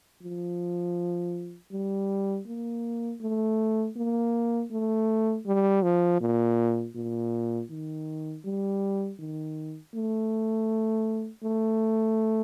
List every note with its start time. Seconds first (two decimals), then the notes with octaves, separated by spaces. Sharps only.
0.23 F3
1.72 G3
2.47 A#3
3.21 A3
3.96 A#3
4.71 A3
5.46 G3
5.83 F3
6.21 A#2
6.95 A#2
7.70 D#3
8.45 G3
9.20 D#3
9.95 A3
11.44 A3